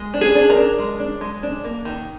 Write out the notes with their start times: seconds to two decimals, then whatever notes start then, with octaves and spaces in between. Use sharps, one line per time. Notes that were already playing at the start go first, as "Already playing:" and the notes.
Already playing: G#3
0.14 D4
0.21 G#4
0.35 D4
0.50 A#4
0.57 D4
0.78 G#3
1.00 D4
1.21 G#3
1.43 D4
1.64 A#3
1.85 D#3